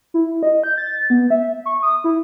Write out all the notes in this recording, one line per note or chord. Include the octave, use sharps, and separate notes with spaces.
E4
D#5
G6
A6
B3
E5
C#6
D#6
E4